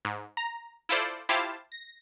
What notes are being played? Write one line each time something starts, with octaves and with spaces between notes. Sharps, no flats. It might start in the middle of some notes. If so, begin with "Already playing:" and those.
G#2
A#5
E4 F4 A4 C5 D5
E4 F4 G4 C5 F5 A5
A#6